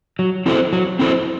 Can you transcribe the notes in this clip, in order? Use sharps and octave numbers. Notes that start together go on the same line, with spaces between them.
F#3
C4 E4 A4 C5
F#3
C4 E4 A4 C5